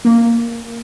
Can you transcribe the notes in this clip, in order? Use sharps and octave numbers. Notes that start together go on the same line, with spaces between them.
A#3